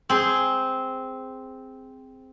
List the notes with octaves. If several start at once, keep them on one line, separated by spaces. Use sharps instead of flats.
C4 G#4